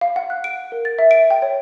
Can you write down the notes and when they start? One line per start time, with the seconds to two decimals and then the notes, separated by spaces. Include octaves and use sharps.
0.01 F5
0.16 F#5
0.30 F#6
0.44 D7
0.72 A#4
0.85 A6
0.99 E5
1.11 D7
1.30 G5
1.42 C#5